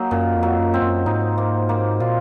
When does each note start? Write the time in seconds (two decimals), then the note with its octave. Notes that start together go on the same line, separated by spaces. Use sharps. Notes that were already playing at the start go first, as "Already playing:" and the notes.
Already playing: F#3 A#3 D#4
0.11 F#2 A#2
0.35 F2
0.43 F#3
0.59 F#2
0.74 C4
0.82 F#2
1.06 G#2 D#4
1.38 A#3
1.69 A#3
2.00 A#2 F4